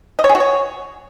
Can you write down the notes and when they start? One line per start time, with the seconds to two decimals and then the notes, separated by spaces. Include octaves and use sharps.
0.19 D#5
0.24 C#5
0.29 G#4
0.35 F#4
0.40 C#5